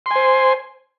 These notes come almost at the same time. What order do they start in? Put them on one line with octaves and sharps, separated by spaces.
C6 G#5 C5